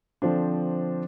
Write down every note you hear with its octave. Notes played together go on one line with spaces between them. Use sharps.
D3 F3 C4 D4